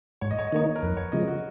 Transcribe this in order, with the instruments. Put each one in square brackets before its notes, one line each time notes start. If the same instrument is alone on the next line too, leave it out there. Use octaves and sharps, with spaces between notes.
[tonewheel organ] G#2 [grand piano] C#5
[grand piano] D#5
C#5
D#5
[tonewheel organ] D#3 A#3 D#4 [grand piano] C#5
[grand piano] A#4
[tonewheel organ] F2 [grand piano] B4
[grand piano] C#5
[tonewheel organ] C#3 F3 G#3 [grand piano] D#5
[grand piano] F#4